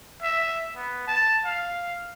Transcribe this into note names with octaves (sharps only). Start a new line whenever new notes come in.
E5
B3
A5
F5